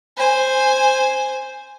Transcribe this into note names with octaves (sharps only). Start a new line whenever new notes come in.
C5 G#5